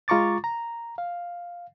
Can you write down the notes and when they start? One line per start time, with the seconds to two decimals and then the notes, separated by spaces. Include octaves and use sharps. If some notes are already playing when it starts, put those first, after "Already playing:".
0.08 G#3 F4 A#5 C#6 D6 A6
0.44 A#5
0.98 F5